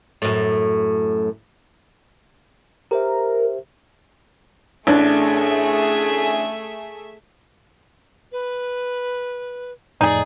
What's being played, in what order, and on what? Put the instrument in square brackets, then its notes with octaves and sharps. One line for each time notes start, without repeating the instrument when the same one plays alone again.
[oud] F#2 A2
[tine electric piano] G4 C5 E5 [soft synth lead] A#4
[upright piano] A1 D4 [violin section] A3 G#4 E5
[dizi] B4
[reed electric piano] F2 A2 [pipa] D#4 G#4 [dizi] D5